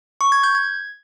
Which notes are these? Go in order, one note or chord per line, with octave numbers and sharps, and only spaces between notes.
C#6
G#6
G6
G#6